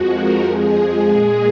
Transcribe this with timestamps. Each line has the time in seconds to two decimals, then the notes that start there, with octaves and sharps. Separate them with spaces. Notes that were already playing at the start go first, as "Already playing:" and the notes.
Already playing: F2 F3 G#3 F#4
0.10 A#4
0.43 F2 F3 G#3 G#4
0.76 G#4
1.10 A#2 G#3